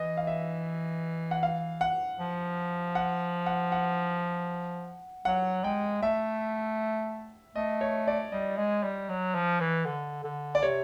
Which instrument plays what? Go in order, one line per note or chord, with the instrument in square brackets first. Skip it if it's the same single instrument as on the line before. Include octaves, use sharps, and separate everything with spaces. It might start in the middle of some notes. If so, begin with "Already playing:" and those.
Already playing: [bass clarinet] E3 [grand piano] D#5
[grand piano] F5
E5
F#5
F5
F#5
[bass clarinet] F3
[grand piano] F#5
F#5
F#5
[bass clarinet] F#3 [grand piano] F#5
[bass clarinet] G#3 [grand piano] G5
[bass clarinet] A3 [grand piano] E5
[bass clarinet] A3 [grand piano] D#5
[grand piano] C#5
D5
[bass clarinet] G3 [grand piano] D#5
[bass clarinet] G#3
G3
F#3
F3
E3
D3
D3
[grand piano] D5
[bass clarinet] C3 [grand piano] C#5